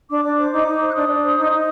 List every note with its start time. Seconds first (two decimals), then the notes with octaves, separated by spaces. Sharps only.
0.10 D4 D6
0.24 D4
0.38 C5
0.52 D#4
0.67 D#4
0.80 C5
0.89 F#6
0.94 D4 D#6
1.08 D4
1.23 C5
1.37 D#4
1.51 D#4